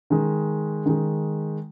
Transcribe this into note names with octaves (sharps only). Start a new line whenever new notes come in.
D#3 G#3
D#3 G#3